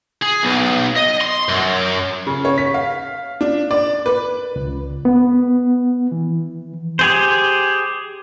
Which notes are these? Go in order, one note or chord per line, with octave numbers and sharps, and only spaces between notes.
G#4
B1
D#5
C6
F#2
C#3
C#5
B6
F5
D4
D5
B4
C#2
B3
E3
G4 G#4 C5